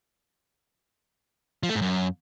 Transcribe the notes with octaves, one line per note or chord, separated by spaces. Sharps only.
F3
A3
G#2
F#2